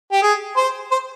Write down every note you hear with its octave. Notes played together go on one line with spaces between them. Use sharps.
G4
G#4
C5
C5